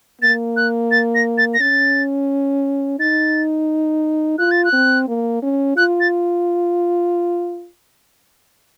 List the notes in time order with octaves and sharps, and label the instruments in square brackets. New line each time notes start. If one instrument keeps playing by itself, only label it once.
[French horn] A#3 [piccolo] A6
[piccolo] F#6
A6
A#6
A6
A#6
[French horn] C#4 [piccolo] A6
[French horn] D#4 [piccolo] A6
[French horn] F4 [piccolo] F#6
[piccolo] A6
F#6
[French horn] C4
A#3
C#4
[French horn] F4 [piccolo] F#6
[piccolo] A6